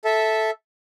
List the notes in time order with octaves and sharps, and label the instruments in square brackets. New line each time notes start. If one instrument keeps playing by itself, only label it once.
[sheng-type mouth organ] A4 E5